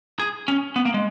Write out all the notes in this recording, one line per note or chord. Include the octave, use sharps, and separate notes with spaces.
G#4
C#4
B3
A#3
G#3